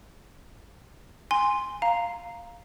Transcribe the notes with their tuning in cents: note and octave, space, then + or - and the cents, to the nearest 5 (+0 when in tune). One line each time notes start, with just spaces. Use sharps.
G#5 -10 C6 +0
F5 +0 A#5 +0